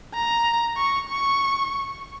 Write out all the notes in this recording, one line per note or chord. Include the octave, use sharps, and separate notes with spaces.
A#5
C#6
C#6